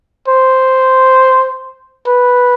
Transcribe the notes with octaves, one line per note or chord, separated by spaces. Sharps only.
C5
B4